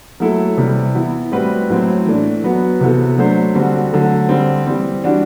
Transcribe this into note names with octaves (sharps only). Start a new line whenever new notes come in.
F#3 A3 E4 A4
C3 E3 G3
E3 B3 E4
A2 G3 C4 F#4 B4
A2 F#3 C4
E3 A3 D4
F#3 B3 F#4 B4
C3 E3 B3 F#4 A4
F#3 A3 D4 A4 C5
D3 G3 C4 F#4
D3 F#3 A3
D3 G3 C4
E3 G3 C4
E3 G3 D4 F#4